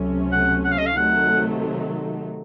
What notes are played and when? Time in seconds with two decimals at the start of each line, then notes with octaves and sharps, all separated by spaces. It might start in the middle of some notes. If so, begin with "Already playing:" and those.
Already playing: C#2 C3 F#3 A3 C#4
0.32 F#5
0.64 F#5
0.71 F5
0.78 D#5
0.86 F5
0.96 C3 D#3 F#3 A3 F#5